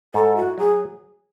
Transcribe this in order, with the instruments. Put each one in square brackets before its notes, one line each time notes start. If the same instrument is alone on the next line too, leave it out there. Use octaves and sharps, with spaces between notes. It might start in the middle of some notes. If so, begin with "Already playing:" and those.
[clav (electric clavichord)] G#2 [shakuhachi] A4
[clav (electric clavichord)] E4 [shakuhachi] F#4
[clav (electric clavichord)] F#3 [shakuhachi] G#4